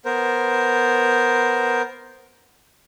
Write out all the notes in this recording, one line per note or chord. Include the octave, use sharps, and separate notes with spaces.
B3 A#4 C5